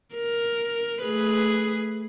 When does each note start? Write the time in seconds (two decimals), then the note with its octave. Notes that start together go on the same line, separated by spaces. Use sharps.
0.15 A#4
1.03 A3 G#4 B4